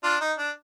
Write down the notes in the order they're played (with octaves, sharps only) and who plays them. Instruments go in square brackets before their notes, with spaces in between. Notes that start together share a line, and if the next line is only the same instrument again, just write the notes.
[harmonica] D4 F4
D#4
D4